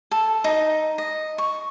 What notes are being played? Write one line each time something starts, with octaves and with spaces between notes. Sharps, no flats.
A4
D#4
D#5
C#6